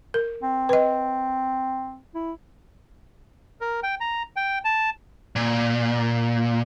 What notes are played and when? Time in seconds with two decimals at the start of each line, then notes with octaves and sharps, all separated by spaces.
0.14 A#4
0.43 C4
0.69 B4 D#5
2.15 E4
3.61 A#4
3.83 G5
4.00 A#5
4.36 G5
4.65 A5
5.36 A#2